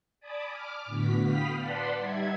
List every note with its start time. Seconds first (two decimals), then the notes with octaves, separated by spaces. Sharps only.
0.20 D5 G#5 A5 B5 D6 D#6
0.50 D6 F6
0.85 A2 D3 B3 F#4 B6
1.22 F5 G5 B5 D#6 F6 B6
1.55 B4 D5 F#5 A5 B5 C6
1.96 G3 D#4 E5 G#6